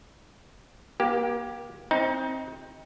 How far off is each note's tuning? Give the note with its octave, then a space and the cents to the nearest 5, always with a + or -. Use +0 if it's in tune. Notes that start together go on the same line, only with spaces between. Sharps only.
A#3 +35 G4 +0
C4 +15 D#4 +25 A#5 +35